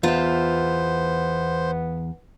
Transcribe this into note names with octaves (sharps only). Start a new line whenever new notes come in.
E2 B3 F4 C5 E5